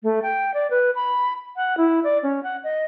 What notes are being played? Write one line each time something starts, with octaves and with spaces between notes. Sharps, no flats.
A3
G5
D5
B4
B5
F#5
E4
D5
C#4
F#5
D#5